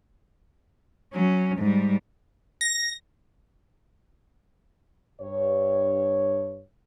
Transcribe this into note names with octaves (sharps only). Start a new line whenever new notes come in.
F#3 C#4
G#2 G3
A#6
G2 C#5